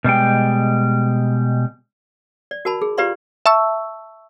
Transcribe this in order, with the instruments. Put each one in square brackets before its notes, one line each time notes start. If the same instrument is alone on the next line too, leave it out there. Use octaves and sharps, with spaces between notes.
[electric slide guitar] B2 G3 G#3 G5
[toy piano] D5
F#4 A#4 A5 B5
G#4
F4 G4 B4 D5 F5 C6
[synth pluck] E5 A5 C#6 E6